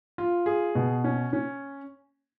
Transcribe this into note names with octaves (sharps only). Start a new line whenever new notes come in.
F4
G#4
B2
C#4
C#4